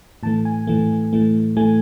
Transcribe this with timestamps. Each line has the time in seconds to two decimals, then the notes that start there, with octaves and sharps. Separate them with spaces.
0.23 A2 E3 A3 A5
0.45 G#5
0.67 A2 E3 A3
1.13 A2 E3 A3
1.56 A2 E3 A3 G#5